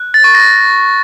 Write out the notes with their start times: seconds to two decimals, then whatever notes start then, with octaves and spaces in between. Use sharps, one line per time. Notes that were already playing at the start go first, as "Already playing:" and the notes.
Already playing: F#6
0.14 A6
0.24 C#6
0.35 A#6